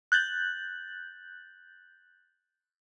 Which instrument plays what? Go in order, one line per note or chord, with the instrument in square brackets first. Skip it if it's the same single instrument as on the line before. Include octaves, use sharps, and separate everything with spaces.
[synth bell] F#6 G6 A6 F#7